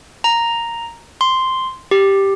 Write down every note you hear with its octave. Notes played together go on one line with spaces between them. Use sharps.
A#5
C6
G4